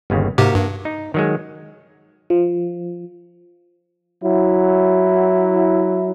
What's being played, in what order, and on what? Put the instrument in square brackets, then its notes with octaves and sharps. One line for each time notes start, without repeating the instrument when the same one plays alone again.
[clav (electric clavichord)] G1 D#2 C#3
[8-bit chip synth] G#2 C3 G4 [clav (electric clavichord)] A#3 F#4
[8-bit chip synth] G2
[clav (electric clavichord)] D#4
D#3 F#3 G#3
[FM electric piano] F3
[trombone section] F#3 E4